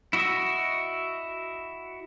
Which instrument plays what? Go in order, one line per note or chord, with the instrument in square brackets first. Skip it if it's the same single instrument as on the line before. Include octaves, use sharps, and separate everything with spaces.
[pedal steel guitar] E4 F#4 D#5 E5